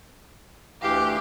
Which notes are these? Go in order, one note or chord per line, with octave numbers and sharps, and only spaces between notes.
D2 E3 G4 F5